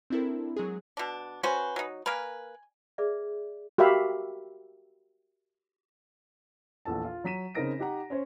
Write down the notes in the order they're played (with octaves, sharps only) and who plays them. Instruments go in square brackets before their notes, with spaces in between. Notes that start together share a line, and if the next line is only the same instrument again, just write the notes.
[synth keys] C4 D4 E4 A4 A#4
F#3 G#3 G#4
[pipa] B2 D4
[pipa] C#4 F#4 C5 [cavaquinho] B4 G#5 C#6
[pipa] F#3 D#4
[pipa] A#3 A#4 B4 [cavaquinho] G#5
[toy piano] G#4 B4 D5 E5
[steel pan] F#4 G4 A#4 E5 F5 B5
[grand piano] A#1 E2 A4 A5
F4
F#3 A#5 B6 D#7 E7
C#3 C4 D#4 A#4 A#6 D7
D#4 G4 F#5 A#5
C#4 C5 C#5